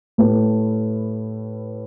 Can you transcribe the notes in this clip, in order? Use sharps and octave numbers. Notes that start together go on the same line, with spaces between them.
A2 A3 G4 B4